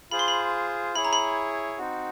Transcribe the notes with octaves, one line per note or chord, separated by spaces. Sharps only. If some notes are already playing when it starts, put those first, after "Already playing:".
F4 G#4 C5 B5
C6
B5
E4 G#4 C#5 B5
A#5
B5
C4 D#4 F#4